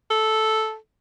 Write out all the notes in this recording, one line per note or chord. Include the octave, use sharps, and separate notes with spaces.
A4